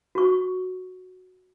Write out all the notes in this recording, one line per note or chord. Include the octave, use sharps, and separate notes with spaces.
F#4 C#6